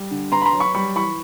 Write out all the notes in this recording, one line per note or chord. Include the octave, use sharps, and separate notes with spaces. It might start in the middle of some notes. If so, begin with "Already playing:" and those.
Already playing: G3
D3
B3 A#5 C6
B5
A#5 C6
F#3
B5 C#6
G3 B5 C#6
E3 B5 C#6